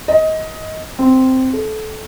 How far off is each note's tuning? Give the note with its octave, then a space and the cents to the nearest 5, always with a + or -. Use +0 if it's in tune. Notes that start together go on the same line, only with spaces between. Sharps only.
D#5 +20
C4 -5
A4 -25